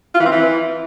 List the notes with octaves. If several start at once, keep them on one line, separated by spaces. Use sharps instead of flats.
F4
E3
C4
E3